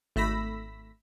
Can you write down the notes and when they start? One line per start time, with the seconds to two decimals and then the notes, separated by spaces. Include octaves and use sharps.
0.16 G#1 A3 B5 E6 A#6 B6